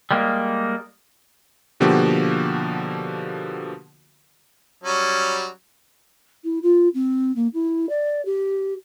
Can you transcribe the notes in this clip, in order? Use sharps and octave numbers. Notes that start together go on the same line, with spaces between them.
G3 G#3 A#3
B2 D3 F3 A#3 F#4 G4
F#3 G3 C#4
E4
F4
C4
A#3
E4
D5
G4